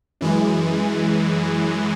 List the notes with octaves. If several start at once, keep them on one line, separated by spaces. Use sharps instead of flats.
F#2 E3 G#3